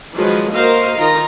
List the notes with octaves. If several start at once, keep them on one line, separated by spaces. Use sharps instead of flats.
D#3 F3 F#3 G#3 B4
A#3 F#4 A#4 C5 D#5 F5
D#3 D#4 F4 A#4 A#5